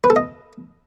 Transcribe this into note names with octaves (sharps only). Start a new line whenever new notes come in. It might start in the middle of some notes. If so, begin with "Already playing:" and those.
B4
A4
D#5